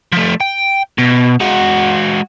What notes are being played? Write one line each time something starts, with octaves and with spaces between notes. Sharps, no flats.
F3 A3
G5
B2
G#3 F#4